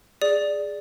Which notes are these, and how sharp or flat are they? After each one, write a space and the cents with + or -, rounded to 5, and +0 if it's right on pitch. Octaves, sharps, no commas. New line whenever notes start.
G#4 +0 D5 +0